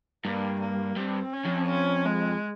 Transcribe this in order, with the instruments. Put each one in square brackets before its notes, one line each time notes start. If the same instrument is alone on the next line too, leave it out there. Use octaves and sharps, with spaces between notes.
[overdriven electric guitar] G2 [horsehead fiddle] A#3
[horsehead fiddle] A#3
[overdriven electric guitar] G2 [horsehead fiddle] C4
[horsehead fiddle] C#4
[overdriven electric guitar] F2
[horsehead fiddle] C#4
G#3